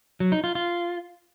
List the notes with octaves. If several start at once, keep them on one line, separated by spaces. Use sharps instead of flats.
F#3
D#4
F4
F4